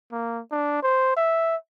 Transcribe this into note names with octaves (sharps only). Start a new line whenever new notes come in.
A#3
D4
C5
E5